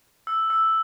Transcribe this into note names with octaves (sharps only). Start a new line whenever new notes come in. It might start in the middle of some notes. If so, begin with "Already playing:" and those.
E6
E6